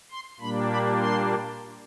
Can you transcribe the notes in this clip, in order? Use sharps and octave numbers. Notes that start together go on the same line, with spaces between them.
C6
A#2 G3 A#3 D4 B5
B5
C6